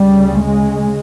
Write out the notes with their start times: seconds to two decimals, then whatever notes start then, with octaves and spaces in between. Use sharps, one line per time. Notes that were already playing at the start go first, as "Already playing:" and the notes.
Already playing: D2 C#3 G3
0.41 G#3